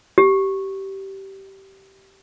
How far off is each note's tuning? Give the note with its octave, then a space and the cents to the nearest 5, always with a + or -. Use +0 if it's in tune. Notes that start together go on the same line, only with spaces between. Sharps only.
G4 -20